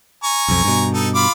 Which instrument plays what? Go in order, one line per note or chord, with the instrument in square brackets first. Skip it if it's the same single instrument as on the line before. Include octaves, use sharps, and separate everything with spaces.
[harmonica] G#5 A#5 C#6
[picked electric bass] B1 F2
G2 B2
[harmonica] D#4 A4
F4 B5 D6